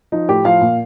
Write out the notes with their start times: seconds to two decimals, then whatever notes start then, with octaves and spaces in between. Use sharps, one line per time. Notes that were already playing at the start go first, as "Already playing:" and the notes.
0.12 F3 D#4
0.28 A2 G4
0.45 F3 F5
0.61 A#2